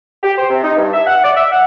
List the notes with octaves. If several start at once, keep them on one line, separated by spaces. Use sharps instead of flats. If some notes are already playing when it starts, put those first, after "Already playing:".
G4
C5
C3
D#4
G2
E5
F#5
D5
E5
F#5